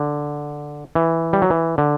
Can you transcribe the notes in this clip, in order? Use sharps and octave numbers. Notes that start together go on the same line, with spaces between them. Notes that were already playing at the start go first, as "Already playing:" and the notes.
Already playing: D3
E3
G3
F#3
E3
D3